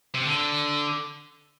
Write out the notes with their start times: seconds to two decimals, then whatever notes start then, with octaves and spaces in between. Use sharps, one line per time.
0.15 C3
0.24 D3